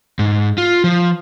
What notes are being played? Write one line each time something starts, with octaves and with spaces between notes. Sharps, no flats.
G#2
F4
F3